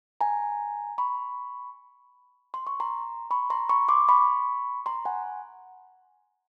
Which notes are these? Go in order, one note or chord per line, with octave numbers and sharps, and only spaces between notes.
G#5 A#5
B5 C#6
C6
C#6
A#5 C6
B5 C#6
A#5 C6
B5 C#6
C6 D6
B5 C#6
A#5 C6
F#5 G#5